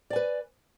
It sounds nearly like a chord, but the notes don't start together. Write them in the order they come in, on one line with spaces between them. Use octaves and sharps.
D5 G#5 B4